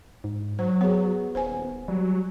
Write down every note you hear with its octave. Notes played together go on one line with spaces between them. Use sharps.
G#2
F#3 C5
B3 G#4 C#5
D#1 C5 G#5
F#3 G3